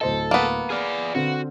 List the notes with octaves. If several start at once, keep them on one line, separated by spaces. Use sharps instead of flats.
D1 A4 C5 D#5
A#3 B3
G#4 D5 F6
D3 C4 F#4